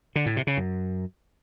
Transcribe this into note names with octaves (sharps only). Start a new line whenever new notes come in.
D3
A2
C3
C#3
F#2